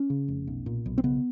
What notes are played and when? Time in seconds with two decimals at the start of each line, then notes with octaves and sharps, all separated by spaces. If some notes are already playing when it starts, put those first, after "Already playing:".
Already playing: C#4
0.10 C#3
0.28 F1
0.47 B1
0.66 A#2
0.86 B1
0.98 C4
1.04 C#3 B3